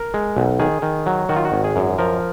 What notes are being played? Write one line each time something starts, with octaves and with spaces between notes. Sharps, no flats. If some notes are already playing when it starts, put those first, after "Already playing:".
Already playing: A#4
G#3
B1
D#3 G#4
D#3
F#3
D#3 F#4
F4
F#4
G#1
G#4
F#2
F3 A#4